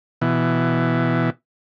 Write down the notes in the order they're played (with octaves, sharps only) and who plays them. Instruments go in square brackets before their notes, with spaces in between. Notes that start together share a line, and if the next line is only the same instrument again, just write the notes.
[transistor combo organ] B2 E3